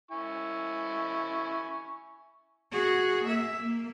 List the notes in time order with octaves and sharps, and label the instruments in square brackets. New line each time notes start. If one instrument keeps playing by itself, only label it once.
[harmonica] E4 G#5 C#6
[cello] F#4 G#4
A#3 E5
A#3